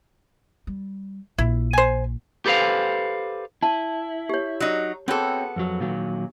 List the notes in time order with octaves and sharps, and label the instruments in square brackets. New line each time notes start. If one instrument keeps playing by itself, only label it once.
[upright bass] G3
[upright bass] A#1 [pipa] E4
[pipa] C5 G#5
[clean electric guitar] G4 A4 B4 C5 F5
[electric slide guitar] E4 [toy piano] A5
[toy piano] G4 C#5
[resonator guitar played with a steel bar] F#3 D#4
[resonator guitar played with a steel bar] B3 A4 [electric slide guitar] C4 C#5 G5 [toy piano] F#4 G#4
[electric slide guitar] F2 F#3
A#2 D#3 F#3